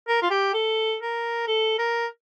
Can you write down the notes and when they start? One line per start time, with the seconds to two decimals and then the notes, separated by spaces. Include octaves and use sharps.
0.08 A#4
0.22 F4
0.31 G4
0.54 A4
1.02 A#4
1.48 A4
1.78 A#4